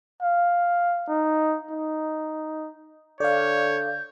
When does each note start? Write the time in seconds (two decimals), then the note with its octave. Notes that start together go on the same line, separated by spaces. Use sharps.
0.22 F5
1.08 D#4
1.71 D#4
3.20 D3 C#5 D5 F5 G6